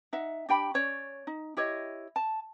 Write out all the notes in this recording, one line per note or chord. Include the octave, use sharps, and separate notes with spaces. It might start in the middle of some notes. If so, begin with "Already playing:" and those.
D#4 E5 F#5
D4 G4 G5 B5
C#4 C#5 D5
D#4
E4 G4 C#5 D#5
A5